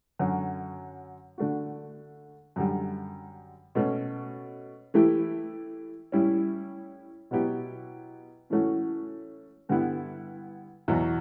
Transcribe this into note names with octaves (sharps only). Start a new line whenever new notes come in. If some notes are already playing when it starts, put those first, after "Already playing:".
F#2 D3 F#3 C#4
D3 A3 D4 F#4
F#2 D3 G3
B2 A3 C#4
E3 A3 E4 G4
A2 G3 C#4 E4
B2 F#3 B3 E4 G4
A2 E3 A3 C#4 F#4
G2 D3 G3 B3 E4
E2 B2 F#3 B3